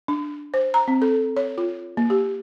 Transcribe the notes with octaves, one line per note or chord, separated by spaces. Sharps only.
D4
C5
A#5
C4
A4
C#5
F4
A#3
G4